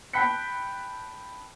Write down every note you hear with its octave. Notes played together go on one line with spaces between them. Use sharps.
G5 A5 B5 F#6 B6 C#7